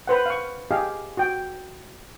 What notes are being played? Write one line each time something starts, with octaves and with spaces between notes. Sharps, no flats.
B4 C5 F#5
F5 C#6
G4 G#4 D#5 F5
F#4 G5